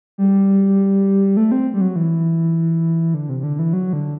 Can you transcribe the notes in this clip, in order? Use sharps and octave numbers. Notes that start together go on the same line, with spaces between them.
G3
A3
C4
G3
F#3
E3
D3
C3
C3
D3
E3
F#3
D3